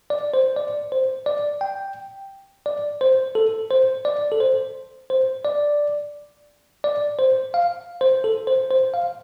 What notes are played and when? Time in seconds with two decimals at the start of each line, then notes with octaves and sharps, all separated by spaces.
0.10 D5
0.34 C5
0.56 D5
0.92 C5
1.26 D5
1.61 G5
2.66 D5
3.01 C5
3.35 A4
3.71 C5
4.05 D5
4.32 A4
4.40 C5
5.10 C5
5.45 D5
6.84 D5
7.19 C5
7.54 F5
8.01 C5
8.24 A4
8.47 C5
8.70 C5
8.94 F5